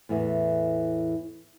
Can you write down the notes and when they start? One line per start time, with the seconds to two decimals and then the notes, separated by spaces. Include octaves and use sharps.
0.09 E2 A2 E3